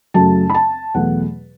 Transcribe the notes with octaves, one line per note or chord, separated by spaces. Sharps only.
F#2 C#3 F#3 A3 A5
B5
A5
E2 B2 F#3 A3 F#5